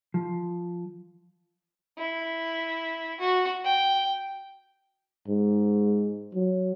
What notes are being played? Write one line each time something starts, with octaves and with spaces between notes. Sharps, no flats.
F3
E4
F#4
G5
G#2
F#3